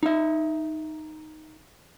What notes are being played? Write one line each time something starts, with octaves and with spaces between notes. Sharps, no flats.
D#4 E5